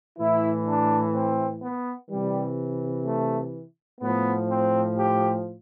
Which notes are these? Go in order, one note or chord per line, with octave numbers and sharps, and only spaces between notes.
A2 E3 E4
D4
C4
B3
C3 E3 G3
A3
A2 F3 B3
C4
G4